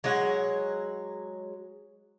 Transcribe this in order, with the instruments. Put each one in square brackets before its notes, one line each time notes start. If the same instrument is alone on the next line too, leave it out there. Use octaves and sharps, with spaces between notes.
[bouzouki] F#3 G#3 C#5 F#5